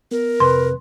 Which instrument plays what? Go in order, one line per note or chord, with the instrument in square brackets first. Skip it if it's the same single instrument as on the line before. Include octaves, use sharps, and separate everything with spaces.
[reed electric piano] B3 [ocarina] A#4
[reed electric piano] F2 C3 C4 [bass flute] B4 [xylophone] C6